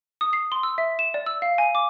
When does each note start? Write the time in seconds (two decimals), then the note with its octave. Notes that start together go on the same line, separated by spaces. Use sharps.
0.21 D#6
0.33 C7
0.52 C6
0.63 E6
0.78 E5
0.99 E7
1.14 D5
1.26 E6
1.42 F5
1.58 G#5
1.75 D6